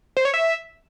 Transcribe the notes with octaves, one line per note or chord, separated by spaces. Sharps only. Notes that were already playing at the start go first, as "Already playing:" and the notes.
C5
C#5
E5